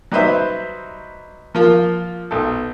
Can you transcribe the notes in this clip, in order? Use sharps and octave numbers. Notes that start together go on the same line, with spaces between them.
F#3 G3 D#4 B4 C5 E5
F3 A#3 F4
B1 A4